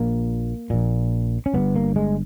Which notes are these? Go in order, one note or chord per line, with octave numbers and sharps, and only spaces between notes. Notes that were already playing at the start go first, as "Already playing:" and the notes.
Already playing: A#1 A#2 A#3
A#1 A#2
C#4
G1 G2 B3
A#3
G#3